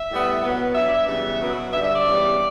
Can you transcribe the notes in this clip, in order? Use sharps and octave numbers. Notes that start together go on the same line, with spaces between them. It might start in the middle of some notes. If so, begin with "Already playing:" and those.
Already playing: E5
A2 G3 B3
B2 F#3 B3
G2 F#3 B3 E5
D5
E5
C#3 E3 G3 B3
B2 F#3 B3
G2 D3 G3 E5
E5
D5
F#2 C#3 E3 G3 B3